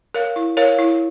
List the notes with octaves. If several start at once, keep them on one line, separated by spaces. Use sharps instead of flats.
A#4 C#5 F5
E4
A#4 C#5 F5
E4